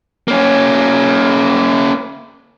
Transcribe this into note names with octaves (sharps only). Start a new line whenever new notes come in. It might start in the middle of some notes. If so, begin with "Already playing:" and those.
A#3 C#4